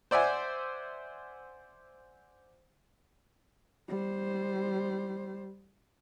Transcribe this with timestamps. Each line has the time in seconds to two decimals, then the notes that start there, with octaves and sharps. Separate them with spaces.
0.11 C5 D5 E5 F#5 G#5
3.88 G3 C5